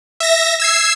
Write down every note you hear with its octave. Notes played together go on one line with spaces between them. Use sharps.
E5 A#6
E6 G#6 C7